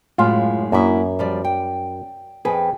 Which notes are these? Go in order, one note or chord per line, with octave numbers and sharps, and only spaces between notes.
F#2 A2 G#3 F4
F#2 A#3 D4 E4
F3 G3 D5
G5
F2 G#4 B4 G5